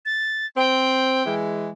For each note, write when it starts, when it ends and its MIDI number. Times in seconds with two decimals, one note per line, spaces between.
0.06 0.46 93
0.57 1.24 60
0.57 1.34 79
1.25 1.68 52
1.25 1.68 56